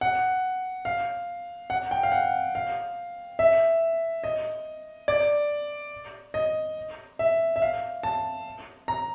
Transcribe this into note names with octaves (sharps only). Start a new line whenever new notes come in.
F#5
F5
F#5
G5
F5
F#5
F5
E5
D#5
D5
D#5
E5
E5
F5
A5
A#5